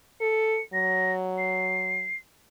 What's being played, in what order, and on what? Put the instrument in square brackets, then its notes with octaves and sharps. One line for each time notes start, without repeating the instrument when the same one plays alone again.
[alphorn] A4 [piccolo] C#7
[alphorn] F#3 [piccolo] A#6
[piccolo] C7